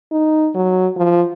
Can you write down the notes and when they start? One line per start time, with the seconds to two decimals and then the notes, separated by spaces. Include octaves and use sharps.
0.12 D#4
0.55 F#3
0.97 F3